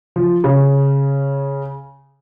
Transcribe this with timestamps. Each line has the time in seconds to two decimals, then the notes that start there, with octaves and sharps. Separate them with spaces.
0.16 F3
0.44 C#3